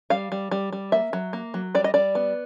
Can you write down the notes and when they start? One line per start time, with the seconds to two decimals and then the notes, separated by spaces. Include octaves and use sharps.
0.10 G3 F5
0.32 G3
0.51 G3
0.73 G3
0.92 A#3 E5
1.13 F#3
1.33 A#3
1.54 F#3
1.75 G3 D5
1.84 D#5
1.94 G3 D5
2.15 B3